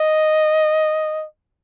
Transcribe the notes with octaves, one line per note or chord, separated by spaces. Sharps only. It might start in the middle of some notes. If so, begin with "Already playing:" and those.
Already playing: D#5